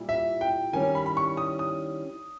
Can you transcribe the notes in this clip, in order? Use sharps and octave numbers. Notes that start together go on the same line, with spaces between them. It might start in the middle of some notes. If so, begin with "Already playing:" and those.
Already playing: A#2 G3 E4
E5
G5
D#3 G3 C#4 E4 G#5
B5
B5
C#6
D#6
D#6